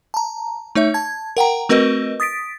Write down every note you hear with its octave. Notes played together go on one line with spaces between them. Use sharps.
A5 A#5
A3 D#4 C#5 E5
A5 G#6
A#4 F#5 G5 A#5
A3 C4 F#4 A#4 B4 D#5
D#6 A6 B6 D7